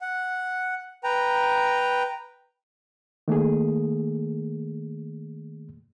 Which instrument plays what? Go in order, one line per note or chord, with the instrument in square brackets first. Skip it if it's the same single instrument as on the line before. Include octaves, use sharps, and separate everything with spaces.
[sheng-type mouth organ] F#5
B4 G5 A#5
[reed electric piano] D#3 A3 A#3 G#4